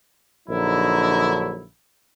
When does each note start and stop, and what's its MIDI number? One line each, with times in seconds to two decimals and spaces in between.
0.49 1.64 34
0.49 1.64 50
0.49 1.64 54
0.49 1.64 63
0.49 1.64 64